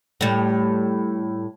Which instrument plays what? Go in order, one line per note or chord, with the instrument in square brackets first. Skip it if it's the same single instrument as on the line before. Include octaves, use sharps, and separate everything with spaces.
[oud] A2 G3